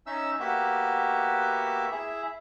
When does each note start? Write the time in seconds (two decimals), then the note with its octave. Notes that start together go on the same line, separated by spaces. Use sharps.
0.06 C#4 D#4 E5 E6
0.40 A#3 B3 F#4 G4 E5
1.92 E4 G#4 E5